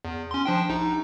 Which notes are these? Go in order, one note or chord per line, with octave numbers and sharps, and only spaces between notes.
E2
C#4 C6
F3 D4 G5
A#1 D#4